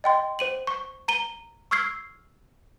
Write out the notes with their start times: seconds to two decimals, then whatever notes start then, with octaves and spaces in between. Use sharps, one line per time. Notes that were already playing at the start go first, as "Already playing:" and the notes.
0.04 D#5 G5 C6
0.39 C5 D#7 F#7
0.67 C#6
1.08 A#5 D#7 G7
1.71 C#6 E6 F6 G#6 C7